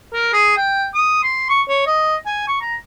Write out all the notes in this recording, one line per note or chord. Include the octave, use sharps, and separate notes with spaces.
A#4
G#4
G5
D#6
C6
C#6
C#5
D#5
G#5
C#6
A#5